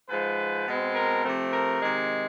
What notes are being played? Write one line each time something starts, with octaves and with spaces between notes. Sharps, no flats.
G#2 F3 G#3 B4
B2 G#3 C4
A#4
C3 F3 A3 C4
A#4
C3 D#3 G#3